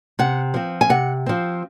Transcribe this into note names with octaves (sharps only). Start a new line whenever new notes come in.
C3 F#5
F3 C4
G#5
C3 F#5
F3 C4